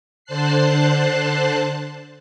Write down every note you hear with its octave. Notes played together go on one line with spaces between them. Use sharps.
D3 C5 A5 F#6 C7